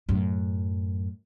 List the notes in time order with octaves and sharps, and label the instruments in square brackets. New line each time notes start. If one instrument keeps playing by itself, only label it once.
[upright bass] F#2 A2